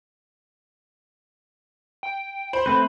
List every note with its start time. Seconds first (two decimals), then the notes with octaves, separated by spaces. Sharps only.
2.03 G5
2.53 C5 B5
2.66 A3 C4 B4